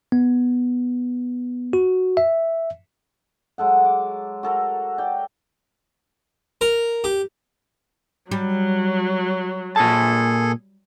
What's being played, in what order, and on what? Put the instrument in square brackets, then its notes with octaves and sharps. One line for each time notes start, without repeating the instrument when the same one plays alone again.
[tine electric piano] B3
F#4
E5
[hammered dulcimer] F#3 G#3 A4 F#5
D6
F#4 A4 A#4
D5 G5
[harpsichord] A#4
G4
[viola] F#3 [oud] G3
[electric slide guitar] A#2 A5 [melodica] G#4 A4